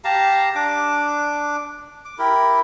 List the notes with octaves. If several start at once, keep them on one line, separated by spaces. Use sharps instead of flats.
G4 F5 A5 A#5
D4 D6
D6
E4 G4 A#4